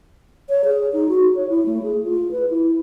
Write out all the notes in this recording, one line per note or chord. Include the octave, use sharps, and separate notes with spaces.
C#5
G#4
D#4
F#4
C#5
E4
A3
G#4
F4
B4
E4